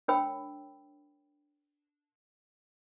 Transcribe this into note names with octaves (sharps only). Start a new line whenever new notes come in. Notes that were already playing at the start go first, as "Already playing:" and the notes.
D4 A#4 C#5 G5 B5 E6